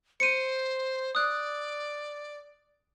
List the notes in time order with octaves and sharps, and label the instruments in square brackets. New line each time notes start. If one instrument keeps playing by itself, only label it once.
[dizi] C5 [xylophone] C#7 D#7
[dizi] D5 [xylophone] D#6 F#6